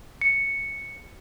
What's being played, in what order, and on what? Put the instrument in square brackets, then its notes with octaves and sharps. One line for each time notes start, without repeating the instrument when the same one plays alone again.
[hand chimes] C#7